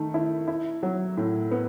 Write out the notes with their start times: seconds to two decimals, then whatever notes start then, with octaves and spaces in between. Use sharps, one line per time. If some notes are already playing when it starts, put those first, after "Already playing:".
Already playing: D#3 A3
0.14 E4
0.48 E4
0.83 F#3
1.17 A2
1.51 B3